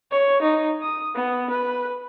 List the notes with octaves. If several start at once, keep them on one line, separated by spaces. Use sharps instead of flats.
C#5
D#4
D#6
B3
B4